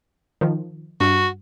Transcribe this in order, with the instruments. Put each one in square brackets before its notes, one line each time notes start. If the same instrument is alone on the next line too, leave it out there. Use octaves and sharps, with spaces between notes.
[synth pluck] D#3 F3
[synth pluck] G2 [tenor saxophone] F#4